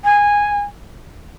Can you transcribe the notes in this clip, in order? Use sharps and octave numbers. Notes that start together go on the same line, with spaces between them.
G#5